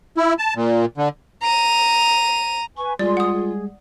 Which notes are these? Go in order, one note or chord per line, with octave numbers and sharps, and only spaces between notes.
E4
A5
A#2
D3
A#5 D#7
B4 G#5 C#6
G3 G#3 F4 G#4 D5 C6
F#5 D#6
G#4